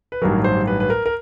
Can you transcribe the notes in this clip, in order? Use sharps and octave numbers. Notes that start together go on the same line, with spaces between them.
B4
A1 G2 D#3 F#3 A#4
C5
B4
B4
A#4
A#4